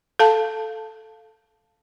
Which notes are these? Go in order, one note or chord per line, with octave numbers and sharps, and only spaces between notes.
A4 F5 A5